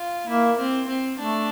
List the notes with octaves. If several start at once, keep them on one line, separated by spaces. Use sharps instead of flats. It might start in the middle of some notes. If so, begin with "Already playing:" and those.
Already playing: F4
A#3 E4
C4
C4
A3 D4